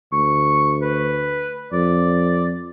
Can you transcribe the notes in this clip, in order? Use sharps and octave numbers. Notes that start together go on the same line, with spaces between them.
D2 C#6
B4
F2 D5